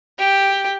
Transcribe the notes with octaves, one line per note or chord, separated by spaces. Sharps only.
G4